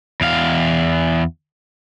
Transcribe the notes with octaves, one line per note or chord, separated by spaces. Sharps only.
E2 F5